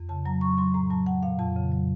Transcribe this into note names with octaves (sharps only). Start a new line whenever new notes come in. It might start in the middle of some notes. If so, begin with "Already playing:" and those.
Already playing: F2
C#3 A5
F#3 A#5
F#3 C#6
F#3 C6
A2 A#5
F#3 A5
F#3 F#5
A#2 F5
F2 A5
C#3
F#3